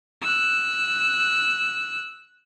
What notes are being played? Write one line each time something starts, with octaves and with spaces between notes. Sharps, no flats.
E6 F#6